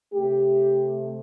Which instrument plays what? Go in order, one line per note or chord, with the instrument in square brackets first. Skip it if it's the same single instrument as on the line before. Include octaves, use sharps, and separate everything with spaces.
[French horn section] C3 A3 G4